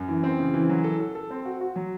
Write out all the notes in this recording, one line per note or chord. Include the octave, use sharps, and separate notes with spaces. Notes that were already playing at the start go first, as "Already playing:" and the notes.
Already playing: F#2
E3
C4
C#3
E3
F#3
A4
A4
A4
C4
F#4
F#4
F#3